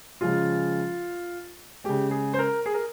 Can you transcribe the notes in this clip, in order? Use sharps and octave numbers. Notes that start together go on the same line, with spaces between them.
C#3 F3 G#3 F4
C#3 G#3 G4
G#4
C5
A#4
G#4
A#4